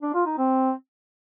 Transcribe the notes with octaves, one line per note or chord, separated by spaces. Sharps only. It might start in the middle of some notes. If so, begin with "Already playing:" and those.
D4
F4
D#4
C4